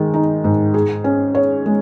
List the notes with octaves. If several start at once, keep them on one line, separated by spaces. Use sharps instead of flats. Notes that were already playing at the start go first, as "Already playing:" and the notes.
Already playing: D#3 G#3
D#4
G#2
G#4
C#4
C#5
G#3